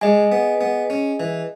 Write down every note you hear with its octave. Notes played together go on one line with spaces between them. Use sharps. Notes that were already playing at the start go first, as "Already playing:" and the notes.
G#3 G#4 D#5 G#5
B3
B3
C#4
E3